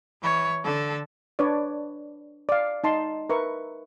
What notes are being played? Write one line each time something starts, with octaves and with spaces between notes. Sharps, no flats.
E3 C#5
D3 A4
D4 B4 C#5 D5
D5 F5
D#4 A5 C6
A#4 B4 E5 C#6